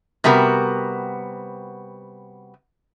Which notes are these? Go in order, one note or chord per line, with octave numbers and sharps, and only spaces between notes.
C3 G3 B3 F#4 A#4